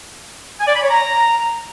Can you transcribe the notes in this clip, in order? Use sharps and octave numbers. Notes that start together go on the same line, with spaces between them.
G#5
D5
B5
C#5
A#5